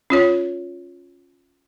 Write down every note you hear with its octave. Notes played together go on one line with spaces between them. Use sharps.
C#4 F4 C#5